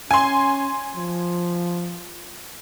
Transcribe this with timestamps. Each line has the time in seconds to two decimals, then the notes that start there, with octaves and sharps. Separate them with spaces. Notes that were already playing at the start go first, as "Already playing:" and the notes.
0.11 C#4 G#5 C6
0.96 F3